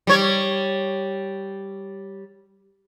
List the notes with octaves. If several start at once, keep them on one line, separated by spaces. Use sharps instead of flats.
G3 C#5